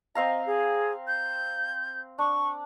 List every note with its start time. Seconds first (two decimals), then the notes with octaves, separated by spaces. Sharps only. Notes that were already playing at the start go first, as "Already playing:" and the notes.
0.15 C4 D#5 F5 A#5
0.46 G#4
1.07 G6
2.19 D4 C#6